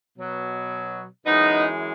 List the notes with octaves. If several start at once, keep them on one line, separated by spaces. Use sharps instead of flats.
B2 F#3
F#2 E3 G#3 B3 D#4